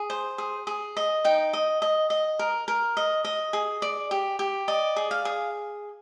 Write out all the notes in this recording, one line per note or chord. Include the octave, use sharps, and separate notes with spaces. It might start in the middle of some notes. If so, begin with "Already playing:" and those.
Already playing: G#4
C5
G#4
G#4
D#5
D#4 G5
D#5
D#5
D#5
A#4
A#4
D#5
D#5
G#4
D5
G4
G4
D5 D#5
G#4
F5
G#4